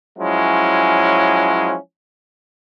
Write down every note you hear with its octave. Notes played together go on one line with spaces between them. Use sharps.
F3 F#3 G#3 C#4 E4